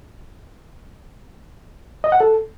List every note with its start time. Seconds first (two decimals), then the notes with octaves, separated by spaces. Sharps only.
2.04 D#5
2.12 F#5
2.20 A4